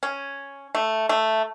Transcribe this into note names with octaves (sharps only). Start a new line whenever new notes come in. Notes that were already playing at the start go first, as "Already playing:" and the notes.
C#4
A3
A3